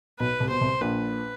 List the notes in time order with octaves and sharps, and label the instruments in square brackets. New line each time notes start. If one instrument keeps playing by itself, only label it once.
[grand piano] B1 B2 [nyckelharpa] B4
[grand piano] C2 C3
[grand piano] B2 [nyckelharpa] C5
[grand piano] C2 C3
[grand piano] A#1 A#2 [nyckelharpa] B4